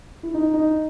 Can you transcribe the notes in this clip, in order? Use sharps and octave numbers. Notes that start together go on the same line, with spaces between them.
E4
D#4
D#4